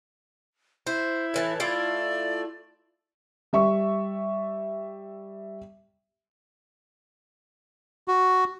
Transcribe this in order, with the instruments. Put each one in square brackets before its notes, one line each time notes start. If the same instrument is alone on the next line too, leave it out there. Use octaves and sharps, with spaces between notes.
[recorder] E4 [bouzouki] C5
[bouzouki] A2 E3 A5
[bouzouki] A3 E4 F4 [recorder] D5
[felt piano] G3 E5 C#6
[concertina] F#4